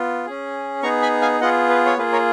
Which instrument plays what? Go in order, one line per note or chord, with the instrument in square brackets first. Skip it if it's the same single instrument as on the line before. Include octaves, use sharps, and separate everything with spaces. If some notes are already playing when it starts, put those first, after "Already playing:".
Already playing: [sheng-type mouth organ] B3 F4
C#4 G#4
B3 D#4 G#4 A#5 C#6
G#5 B5
F5 G#5
B3 F4 G#4 D#5 F#5
B4
C#5
A#3 F4 G#4 B4
A#4 C#5